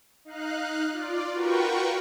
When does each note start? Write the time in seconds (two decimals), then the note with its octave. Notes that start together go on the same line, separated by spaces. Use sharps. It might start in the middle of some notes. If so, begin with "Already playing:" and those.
0.25 D#4 F5 F#6
0.92 F4 D5
1.33 F4 F#4 A#4 B4 G5 C#6